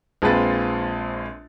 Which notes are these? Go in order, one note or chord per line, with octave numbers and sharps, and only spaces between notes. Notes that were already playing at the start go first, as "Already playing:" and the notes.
A#1 G#3 C4 F4 B4 A6